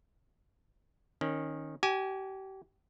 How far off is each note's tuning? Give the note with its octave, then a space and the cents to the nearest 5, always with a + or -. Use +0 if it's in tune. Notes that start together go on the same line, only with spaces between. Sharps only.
D#3 -5 C#4 -20
G4 -35 G#5 +0